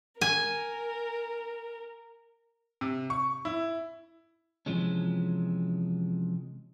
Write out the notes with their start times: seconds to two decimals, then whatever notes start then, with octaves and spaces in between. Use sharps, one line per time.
0.21 A#4 G#5
2.81 C3
3.10 C#6
3.45 E4
4.66 C3 E3 F3 G#3 C#4